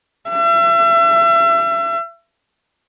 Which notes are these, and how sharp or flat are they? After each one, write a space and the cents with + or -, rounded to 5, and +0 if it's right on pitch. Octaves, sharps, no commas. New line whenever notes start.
E5 +35